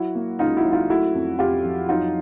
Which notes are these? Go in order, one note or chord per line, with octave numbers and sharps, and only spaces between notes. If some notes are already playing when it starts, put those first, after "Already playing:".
Already playing: F#3 E4 F#4
A#3
C#2 D#4 F4
E4 F#4
F#3
D#4 F4
A3 E4 F#4
F2
F2 F4 G4
F3
F#3 D#4 F4